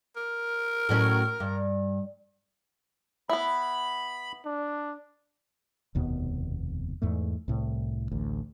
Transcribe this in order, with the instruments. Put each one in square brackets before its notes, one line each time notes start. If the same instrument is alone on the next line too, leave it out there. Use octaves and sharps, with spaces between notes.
[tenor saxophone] A#4
[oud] A2 F#3 C#4
G2
[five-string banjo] B3 E4 [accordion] B5
[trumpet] D4
[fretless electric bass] F1 D#2 B2 B3
E2 G#2 A3
C2 A2
A1 D2